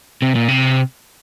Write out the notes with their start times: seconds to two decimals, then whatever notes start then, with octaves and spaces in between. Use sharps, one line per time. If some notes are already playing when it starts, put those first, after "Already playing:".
0.22 C3
0.35 A#2
0.48 C3